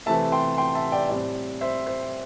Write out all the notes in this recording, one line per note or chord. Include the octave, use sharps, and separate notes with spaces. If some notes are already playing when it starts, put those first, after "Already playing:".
C3 E3 A3 C4 E5 A5
G5 C6
G5 C6
E5 A5
D5 G5
A2 G3 C4 D5
C5 E5
C5